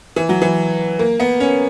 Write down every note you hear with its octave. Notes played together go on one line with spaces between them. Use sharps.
E3
F#3
E3
A#3
B3
C#4